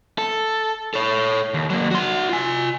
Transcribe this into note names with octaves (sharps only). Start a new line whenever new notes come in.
A4
A4 C#5
D#2
F#3 A#3
F#4 C6
F4 G#5